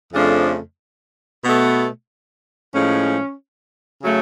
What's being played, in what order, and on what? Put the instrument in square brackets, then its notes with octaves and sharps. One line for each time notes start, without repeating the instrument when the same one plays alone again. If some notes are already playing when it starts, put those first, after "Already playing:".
[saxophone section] F2 C#3 F3 A3 D4
B2 A3 B3
A2 F3 G#3 C#4
C#3 F#3 A3